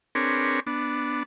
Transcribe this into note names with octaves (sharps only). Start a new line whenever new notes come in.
C4 D4 G#4 A#4 B4 C#5
B3 D4